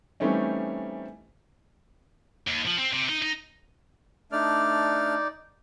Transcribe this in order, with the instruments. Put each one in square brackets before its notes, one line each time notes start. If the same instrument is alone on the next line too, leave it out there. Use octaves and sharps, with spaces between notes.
[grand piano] E3 G3 A3 C4 C#4 D#4
[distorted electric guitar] D#2
F3
C4
C3
D#4
D#4
[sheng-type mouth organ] A3 D4 F6 [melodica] D#4 D5